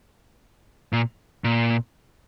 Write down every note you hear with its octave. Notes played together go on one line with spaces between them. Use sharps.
A#2
A#2